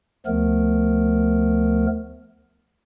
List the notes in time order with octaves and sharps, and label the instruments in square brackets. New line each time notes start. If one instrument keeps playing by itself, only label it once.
[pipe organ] D2 F3 A3 B3 A#4